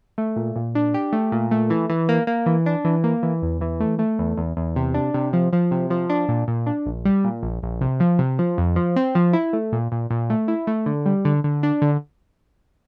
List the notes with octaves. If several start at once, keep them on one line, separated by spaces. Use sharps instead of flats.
A3
A#2
A#2
D4
G4
A3
A#2
A3
E3
E3
A#3
A#3
E3
D4
E3
A#3
E3
E2
E3
A3
A3
E2
E2
E2
C3
D4
C3
F3
F3
C3
F3
D4
A#2
A#2
D4
A#1
G3
A#2
A#1
A#1
C3
F3
C3
F3
F2
F3
C4
F3
E4
A3
A#2
A#2
A#2
A3
E4
A3
D3
G3
D3
D3
D4
D3